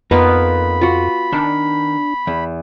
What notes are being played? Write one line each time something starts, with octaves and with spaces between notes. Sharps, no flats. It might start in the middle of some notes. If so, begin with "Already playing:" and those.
F2 A#3 B3 D#4 F4 B5
F4 F#4
D#3 D4
E2